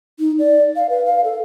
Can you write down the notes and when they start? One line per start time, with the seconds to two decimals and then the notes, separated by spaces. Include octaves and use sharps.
0.19 D#4
0.39 D5
0.76 F5
0.89 B4
1.05 F5
1.24 A4